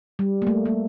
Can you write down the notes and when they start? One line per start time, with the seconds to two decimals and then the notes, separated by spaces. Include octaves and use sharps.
0.19 G3
0.42 A#3
0.47 A3
0.66 A#3